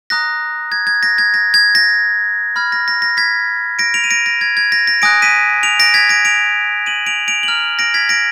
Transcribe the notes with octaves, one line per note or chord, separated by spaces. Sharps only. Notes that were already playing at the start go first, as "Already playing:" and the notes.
A#5 D#6 F#6 A#6
G#6
G#6
A#6
G#6
A#6
G#6
A#6
B5 F6 G#6
A#6
A#6
A#6
G#6 B6
A#6 D7
D7 F7
D#7
A#6 D7
A#6
G#6
G#6
A#6
A#6
G#5 D#6 F#6 A#6 D7
B6 D#7
D7 F7
A#6 D7
G#6 B6
A#6 D7
D7 F7
D#7 F#7
D7 F7
D7 F7
F#7
A#5 F6 D7 F7
A#6 D7
G#6 B6
A#6 D7